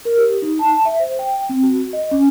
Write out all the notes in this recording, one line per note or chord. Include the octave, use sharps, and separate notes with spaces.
A#4
G4
D#4
A5
E5
C5
G5
C4
F#4
D#5
C#4